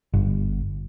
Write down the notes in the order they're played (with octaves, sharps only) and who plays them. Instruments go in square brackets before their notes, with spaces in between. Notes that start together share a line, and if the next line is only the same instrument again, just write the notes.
[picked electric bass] G1